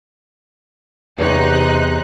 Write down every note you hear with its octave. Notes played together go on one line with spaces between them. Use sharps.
E2 C3 D#4 C#5 F#6